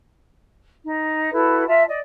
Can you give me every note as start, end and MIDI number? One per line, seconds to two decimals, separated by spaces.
0.84 1.32 63
1.32 1.65 64
1.32 1.65 66
1.32 1.65 69
1.32 1.65 71
1.66 1.84 65
1.66 1.84 76
1.66 1.84 81
1.87 1.98 74
1.87 1.98 75